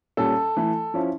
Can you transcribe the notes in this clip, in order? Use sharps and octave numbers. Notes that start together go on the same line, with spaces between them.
A#2 G3 C#4 A4
E3 A3 E4
F3 C#4 E4